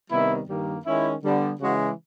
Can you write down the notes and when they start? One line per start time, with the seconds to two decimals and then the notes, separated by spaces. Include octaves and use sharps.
0.10 C3 D#3 G3 B3 E4
0.48 G2 D#3 G3 A#3
0.85 D#3 G#3 C#4 E4
1.23 D3 G3 B3
1.60 C#3 E3 G#3 F#4